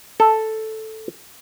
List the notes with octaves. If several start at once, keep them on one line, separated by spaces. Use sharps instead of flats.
A4